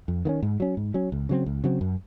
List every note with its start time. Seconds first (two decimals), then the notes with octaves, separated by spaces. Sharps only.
0.08 F2
0.25 D#3 A#3 C#4
0.42 G#2
0.60 F#3 C#4
0.77 G#2
0.94 F#3 C#4
1.12 C#2
1.29 C#3 F#3 C4
1.46 C#2
1.64 C#3 F#3 C4
1.81 F#2